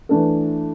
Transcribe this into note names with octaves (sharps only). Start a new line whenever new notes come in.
E3 A3 D4 A4